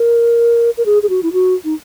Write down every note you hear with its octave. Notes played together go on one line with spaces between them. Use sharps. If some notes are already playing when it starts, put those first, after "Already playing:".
Already playing: A#4
A#4
G#4
G#4
F#4
E4
F#4
D#4